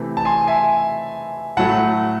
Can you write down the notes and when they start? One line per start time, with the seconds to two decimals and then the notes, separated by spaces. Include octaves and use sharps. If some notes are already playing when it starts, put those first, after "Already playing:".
Already playing: C3 E3 A3
0.17 A5
0.25 G#5 C6
0.47 E5 G#5
1.57 A2 F#3 A3 F#5 A5